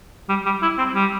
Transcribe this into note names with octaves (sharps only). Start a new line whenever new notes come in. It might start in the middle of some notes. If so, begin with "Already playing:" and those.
G3
G3
E4
C4
G3